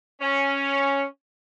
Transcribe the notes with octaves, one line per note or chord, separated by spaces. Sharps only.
C#4